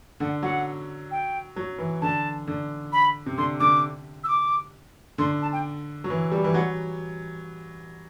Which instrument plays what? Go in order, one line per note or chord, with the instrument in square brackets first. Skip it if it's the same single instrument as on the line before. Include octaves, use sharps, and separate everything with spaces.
[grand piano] D3 [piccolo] F#5
[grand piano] F#3 [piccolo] F#5
[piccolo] G5
[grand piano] F#3
E3
[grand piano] D3 [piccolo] A5
[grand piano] D3
[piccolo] B5
[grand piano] C3
[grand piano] D3 [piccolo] C6
[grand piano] D3 [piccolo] D6
[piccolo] E6
D6
[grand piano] D3 [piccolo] C6
[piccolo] A5
G5
[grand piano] F#3
E3
G3
E3
[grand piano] F#3 [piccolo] F#5